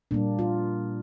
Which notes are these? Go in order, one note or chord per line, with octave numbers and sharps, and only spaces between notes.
A#2 G3 A#3 D4
F4